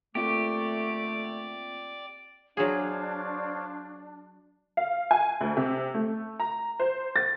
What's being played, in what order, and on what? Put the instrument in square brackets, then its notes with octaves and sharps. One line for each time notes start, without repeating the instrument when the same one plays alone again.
[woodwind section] D3 A3 [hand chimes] A#3 C4 F4 [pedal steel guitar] G4 [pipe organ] D5
[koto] F#3 G#4 [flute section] D4 [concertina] C5 C#5 F5
[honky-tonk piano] F5
G#5
D2
C3
A3
A#5
C5
A6